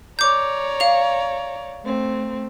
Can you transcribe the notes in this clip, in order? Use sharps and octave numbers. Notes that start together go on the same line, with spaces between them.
C#5 D5 A#5 D6 G6
F5 F7
A3 C4